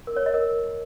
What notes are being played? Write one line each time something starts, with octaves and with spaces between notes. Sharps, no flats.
A#4
C#5
D#5
A#4